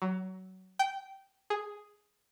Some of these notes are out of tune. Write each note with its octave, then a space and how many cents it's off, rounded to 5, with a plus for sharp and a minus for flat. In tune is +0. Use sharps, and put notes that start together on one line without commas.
F#3 +20
G5 -15
G#4 +0